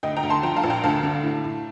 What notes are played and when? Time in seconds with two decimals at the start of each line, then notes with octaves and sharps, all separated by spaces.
0.03 D2 D#5 G5
0.16 G5 A#5
0.23 D2
0.30 A5 C6
0.43 F3 G5 A#5
0.56 F5 A5
0.63 A#1
0.70 G5 A#5
0.84 D2 F5 A5
1.03 D3
1.23 A2
1.44 A2